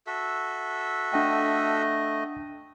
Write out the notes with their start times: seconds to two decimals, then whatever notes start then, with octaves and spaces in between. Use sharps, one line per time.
0.07 F#4 A4 E5
1.13 A3 D4 D#5 F#5 G5